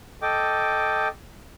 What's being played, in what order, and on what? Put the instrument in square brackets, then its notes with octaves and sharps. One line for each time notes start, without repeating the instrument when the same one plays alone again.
[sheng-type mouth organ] A4 D#5 G5 D6